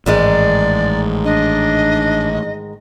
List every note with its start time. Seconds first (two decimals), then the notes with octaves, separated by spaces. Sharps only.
0.06 A1 G#2 D#3 G#3 D5
1.24 D4 D#5